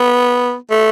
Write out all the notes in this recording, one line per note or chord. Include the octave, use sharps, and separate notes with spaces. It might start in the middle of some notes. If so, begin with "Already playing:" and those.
Already playing: B3
A3